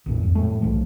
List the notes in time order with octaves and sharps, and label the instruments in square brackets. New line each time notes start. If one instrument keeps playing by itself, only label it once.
[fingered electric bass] A#1 E2 A2
F2
A2 A3
B1 F3